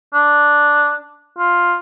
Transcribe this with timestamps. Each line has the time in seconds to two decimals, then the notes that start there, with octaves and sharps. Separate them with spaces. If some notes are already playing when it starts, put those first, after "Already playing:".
0.14 D4
1.38 F4